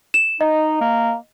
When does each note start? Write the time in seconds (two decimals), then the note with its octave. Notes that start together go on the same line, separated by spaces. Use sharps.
0.14 E7
0.41 D#4 D#5
0.81 A#3